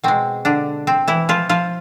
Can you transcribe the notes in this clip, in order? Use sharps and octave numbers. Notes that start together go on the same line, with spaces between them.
B2 G#3 C4
D3 D4
C4
E3 E4
F3 F4
F3 F4